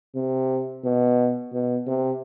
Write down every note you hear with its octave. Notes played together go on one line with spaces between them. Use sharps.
C3
B2
B2
C3